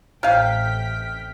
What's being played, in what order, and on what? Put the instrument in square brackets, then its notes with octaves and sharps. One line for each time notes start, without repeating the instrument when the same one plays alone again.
[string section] A1 G5 B6 [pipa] C3 F5 [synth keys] F6